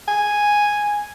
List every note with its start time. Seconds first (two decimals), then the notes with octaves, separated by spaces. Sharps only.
0.08 G#5